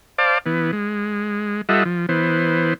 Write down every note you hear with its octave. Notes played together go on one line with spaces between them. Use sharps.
C5 D5 F5 A5 D6
E3 B3
G#3
G3 F4 A4 D#5 E5 F#5
F3
E3 B3 C5